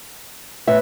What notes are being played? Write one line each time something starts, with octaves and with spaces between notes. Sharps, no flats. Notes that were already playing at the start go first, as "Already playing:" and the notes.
A2 B4 E5